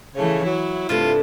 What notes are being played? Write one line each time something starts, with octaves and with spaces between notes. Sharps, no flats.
C#3 E3 A3 C#5
F#3 E4
G2 C3 A3 F4